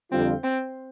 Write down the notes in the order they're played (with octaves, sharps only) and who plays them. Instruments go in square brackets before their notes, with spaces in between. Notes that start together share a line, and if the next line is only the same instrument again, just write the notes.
[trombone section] F2 D3 G3 F4 [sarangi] C4
[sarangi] C4